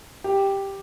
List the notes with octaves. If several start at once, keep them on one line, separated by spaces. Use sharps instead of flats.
G4